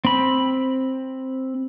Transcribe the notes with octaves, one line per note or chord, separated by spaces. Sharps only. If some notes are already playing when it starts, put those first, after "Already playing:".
C4 B5